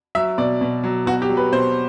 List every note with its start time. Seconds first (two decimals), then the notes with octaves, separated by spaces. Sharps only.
0.15 F#3 E5
0.38 B2 D5
0.61 B2
0.84 F#3
1.06 B2 F#4
1.22 G4
1.29 F#3
1.37 B4
1.53 B2 C5